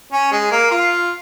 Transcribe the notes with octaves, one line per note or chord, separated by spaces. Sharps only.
C#4
G#3
A#3
F4